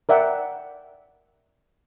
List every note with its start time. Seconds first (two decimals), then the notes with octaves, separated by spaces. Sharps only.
0.09 A#4 D5 E5 F#5 G5